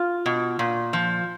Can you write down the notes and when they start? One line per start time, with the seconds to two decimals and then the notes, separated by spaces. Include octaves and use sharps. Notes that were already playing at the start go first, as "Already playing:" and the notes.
Already playing: F4
0.26 B2
0.59 A#2
0.93 F3